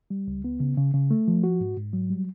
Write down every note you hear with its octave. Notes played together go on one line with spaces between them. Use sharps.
G3
C#2
B3
C#3
C#3
C#3
A3
F3
F#4
G#2
G#2
F#3
G3